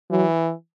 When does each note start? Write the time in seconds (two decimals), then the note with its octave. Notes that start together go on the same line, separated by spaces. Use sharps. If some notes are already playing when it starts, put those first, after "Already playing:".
0.11 E3 F#3